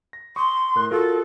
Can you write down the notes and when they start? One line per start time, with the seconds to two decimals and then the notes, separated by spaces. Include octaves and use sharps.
0.13 A#6
0.36 C6 C#6 D#6
0.76 A2 A#4 F#6
0.91 F4 F#4 A4 A#4